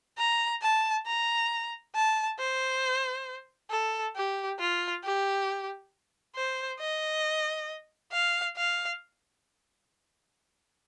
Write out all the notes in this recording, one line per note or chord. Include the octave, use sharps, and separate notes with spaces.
A#5
A5
A#5
A5
C5
A4
G4
F4
G4
C5
D#5
F5
F5